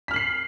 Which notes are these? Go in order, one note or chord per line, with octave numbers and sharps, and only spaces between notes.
F6 B6 C7 F#7